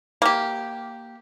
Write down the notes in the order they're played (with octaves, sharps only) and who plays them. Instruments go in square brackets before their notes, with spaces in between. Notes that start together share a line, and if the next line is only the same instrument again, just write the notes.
[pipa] A#3 G4